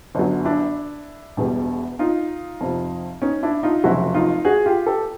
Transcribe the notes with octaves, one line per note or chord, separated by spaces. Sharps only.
G1 F#2 D3 F#3
D4 E4
E1 E2 B2 G3
D#4 F4
F2 C3 F3
C#4 D#4
D4 E4
D#4 F4
F1 F2 C#3 F#3 E4 F#4
D#4 F4
F#4 G#4
F4 G4
G4 A4